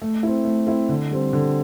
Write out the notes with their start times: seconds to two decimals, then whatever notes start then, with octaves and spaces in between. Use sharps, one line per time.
0.02 A3
0.23 C4 E4
0.45 A3
0.67 C4 E4
0.89 D3
1.11 G3 C4
1.33 D3